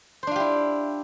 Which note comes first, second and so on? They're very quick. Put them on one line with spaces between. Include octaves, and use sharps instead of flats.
C5 D4 F4 G4 E4